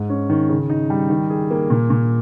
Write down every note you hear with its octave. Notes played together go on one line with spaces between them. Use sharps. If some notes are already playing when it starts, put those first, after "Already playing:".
Already playing: G#2
C#4
D#3
C#3
D#4
G3
D#3
G#4
A#3
A#2
A#2